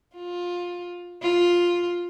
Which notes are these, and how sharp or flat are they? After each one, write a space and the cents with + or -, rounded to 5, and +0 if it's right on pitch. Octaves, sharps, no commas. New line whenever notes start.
F4 +15
F4 +5